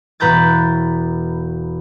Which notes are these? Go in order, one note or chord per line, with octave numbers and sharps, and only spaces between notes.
E1 B4 A#5 G6 A6